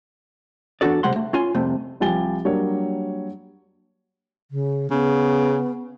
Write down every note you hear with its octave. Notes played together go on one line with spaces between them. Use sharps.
E2 G2 D4 F#4 A4 D5
C3 G3 G#3 F#5 C6
A3
C#4 F4 G#5 C6
C2 F2 C3 A3
C2 F3 G4 G#5 A6 G7
F#3 G3 A#3 D4 C#5
C#3
C#3 B3